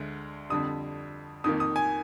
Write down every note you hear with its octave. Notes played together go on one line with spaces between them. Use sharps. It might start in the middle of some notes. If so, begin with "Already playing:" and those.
Already playing: D2 D3 G#3
F2 D3 G3 D#6
F2 D#3 A#3 D#6
D#6
G#5